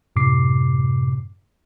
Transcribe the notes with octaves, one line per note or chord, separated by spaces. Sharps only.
F#2 A2 C3 D6 C7